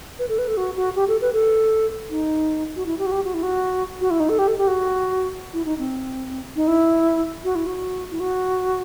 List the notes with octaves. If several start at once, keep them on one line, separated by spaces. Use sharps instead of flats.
B4
A4
B4
A4
F#4
F#4
G4
A4
B4
A4
D#4
F#4
E4
G4
F#4
G4
F#4
E4
F#4
F#4
E4
D#4
A4
G4
A4
G4
F#4
E4
D#4
C4
D#4
E4
F#4
E4
F#4
E4
F#4